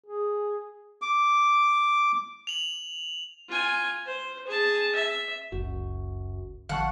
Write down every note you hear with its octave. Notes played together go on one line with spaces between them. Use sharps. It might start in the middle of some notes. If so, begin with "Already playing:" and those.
G#4
D6
F7 F#7
F4 G#5
C5
G#4 A5
E5
F#1 C#2 F#2 F#4
A1 D3 F3 F5 F#5 A5 C#6